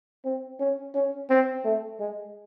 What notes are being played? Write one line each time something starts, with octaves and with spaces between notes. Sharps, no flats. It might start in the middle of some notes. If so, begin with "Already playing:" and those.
C4
C#4
C#4
C4
A3
G#3